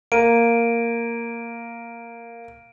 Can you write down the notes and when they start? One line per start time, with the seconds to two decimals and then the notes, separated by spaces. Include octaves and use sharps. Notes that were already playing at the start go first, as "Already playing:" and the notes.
0.12 A#3 D7 D#7